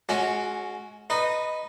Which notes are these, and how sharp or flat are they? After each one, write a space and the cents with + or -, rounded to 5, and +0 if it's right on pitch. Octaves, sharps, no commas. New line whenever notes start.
G#3 +25 C#4 +0 F#4 -5
D#4 +0 B4 +0 D#5 -20